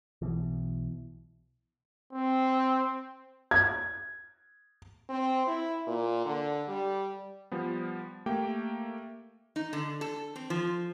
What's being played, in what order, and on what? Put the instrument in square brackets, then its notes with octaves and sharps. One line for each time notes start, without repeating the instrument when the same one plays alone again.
[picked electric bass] B1 B2 E3
[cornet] C4
[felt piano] G#6
[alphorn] C4
E4
A#2
D3
G3
[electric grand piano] F3 G3 B3
A3 A#3 G4 G5
[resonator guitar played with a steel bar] D#4
D3
A4
C4
F3